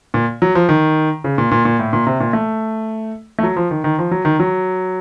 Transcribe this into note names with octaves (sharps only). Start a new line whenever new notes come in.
A#2
F#3
F3
D#3
C#3
A#2
A#2
A#2
A2
A#2
C3
A#2
A3
A3
F#3
F3
D#3
D#3
F3
F#3
D#3
F#3